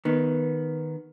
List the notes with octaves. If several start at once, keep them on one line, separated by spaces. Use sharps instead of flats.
D#3 B3